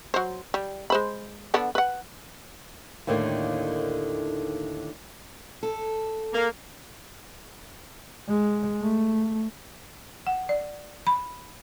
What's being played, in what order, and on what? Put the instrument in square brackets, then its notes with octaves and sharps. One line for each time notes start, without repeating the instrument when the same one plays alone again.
[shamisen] F#3 C5
G3
G#3 C5 B5
D3 B3 D4
B4 F#5
[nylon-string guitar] D#2 A2 D3 D#3 G3 A#3
[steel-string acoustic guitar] A4
[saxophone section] A#3
[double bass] G#3
A3
[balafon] F#5
D5
B5